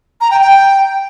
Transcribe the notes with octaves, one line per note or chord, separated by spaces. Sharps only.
A#5
G5
G5